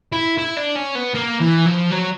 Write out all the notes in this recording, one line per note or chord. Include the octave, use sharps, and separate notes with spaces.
E4
E4
D4
C#4
B3
A#3
E3
F3
F#3